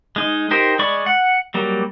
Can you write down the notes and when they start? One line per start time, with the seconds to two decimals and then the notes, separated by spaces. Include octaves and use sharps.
0.16 G#3 D#4
0.51 D#4 G4 A#4 C5
0.79 G#3 D5 B5 C#6
1.06 F#5
1.54 F#3 G3 A#3